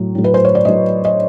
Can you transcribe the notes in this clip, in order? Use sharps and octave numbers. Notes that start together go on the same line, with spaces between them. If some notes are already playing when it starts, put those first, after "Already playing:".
Already playing: A2 F#3
A2 F#3
B4
C5
C#5
D5
A2 F#3 D#5
D#5